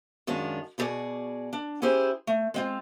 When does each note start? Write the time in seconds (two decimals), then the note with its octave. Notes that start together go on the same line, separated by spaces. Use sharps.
0.27 F#2 D#3 G#3 D4 F4
0.78 B2 E4 F#4 G#4 D5
1.53 D4
1.82 C#4 E4 G4 G#4 C5
2.27 A3
2.54 G#3 C4 F4